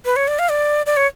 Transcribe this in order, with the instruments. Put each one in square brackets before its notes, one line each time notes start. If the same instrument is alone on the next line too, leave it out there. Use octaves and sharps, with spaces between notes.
[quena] B4
C#5
D5
F5
D5
D5
C#5